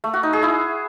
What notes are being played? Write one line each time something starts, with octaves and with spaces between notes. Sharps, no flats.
A3
F#4
D#4
G#4
E4